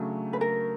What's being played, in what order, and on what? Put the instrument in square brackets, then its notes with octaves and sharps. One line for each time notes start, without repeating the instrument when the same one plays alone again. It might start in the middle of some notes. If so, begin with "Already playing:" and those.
Already playing: [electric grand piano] C#3 F#3 A3 D4
[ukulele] B4
A#4